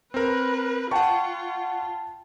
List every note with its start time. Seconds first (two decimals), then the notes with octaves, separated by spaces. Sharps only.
0.14 C4 A#4 B4
0.91 F4 F#5 G5 A5 C#6